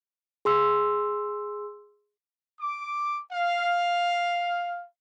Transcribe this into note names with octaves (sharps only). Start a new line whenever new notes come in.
G#4 C6 E6
D6
F5